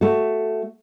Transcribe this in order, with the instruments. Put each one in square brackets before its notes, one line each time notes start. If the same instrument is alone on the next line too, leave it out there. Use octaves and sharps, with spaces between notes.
[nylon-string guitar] A3 F#4